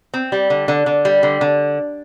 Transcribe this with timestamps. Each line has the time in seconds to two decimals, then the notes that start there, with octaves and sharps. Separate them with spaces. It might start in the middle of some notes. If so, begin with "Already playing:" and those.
0.14 C4
0.32 G3
0.50 D3
0.68 D3
0.86 D3
1.05 G3
1.23 D3
1.41 D3